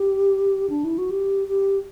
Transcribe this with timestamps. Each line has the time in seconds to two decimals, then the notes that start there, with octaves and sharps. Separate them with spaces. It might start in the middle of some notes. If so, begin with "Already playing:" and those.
Already playing: G4
0.70 D4
0.84 E4
0.98 F#4
1.11 G4
1.48 G4